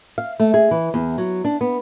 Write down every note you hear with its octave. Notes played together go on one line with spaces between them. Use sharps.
F5
A3
G#4
E3
E2
F#3
D4
B3